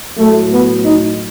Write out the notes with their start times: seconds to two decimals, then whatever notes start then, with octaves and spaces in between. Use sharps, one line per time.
0.18 A2 F#3 A3
0.51 B3
0.83 D#4